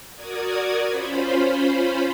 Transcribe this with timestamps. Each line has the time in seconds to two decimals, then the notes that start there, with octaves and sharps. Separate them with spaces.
0.15 F#4 A#4 D5 D#6 G#6
0.86 C#4 F4 C5 B5